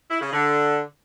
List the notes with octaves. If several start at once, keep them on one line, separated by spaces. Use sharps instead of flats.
E4
C#3
D3